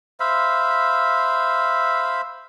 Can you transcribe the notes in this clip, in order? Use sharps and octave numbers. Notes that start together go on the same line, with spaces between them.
C5 E5 F5 B5